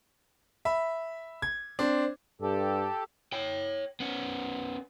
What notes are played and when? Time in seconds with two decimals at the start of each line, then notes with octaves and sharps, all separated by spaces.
0.65 E5 B5
1.42 G#6
1.79 C4 D4
2.42 G2 G4 A4
3.33 C#5 G5
4.00 B3 C#4